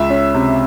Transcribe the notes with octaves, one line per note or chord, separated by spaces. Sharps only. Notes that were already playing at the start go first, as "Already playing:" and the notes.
Already playing: C#2 E5
C#4
C3